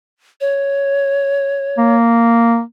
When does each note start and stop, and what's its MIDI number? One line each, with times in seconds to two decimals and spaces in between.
0.41 1.96 73
1.78 2.60 58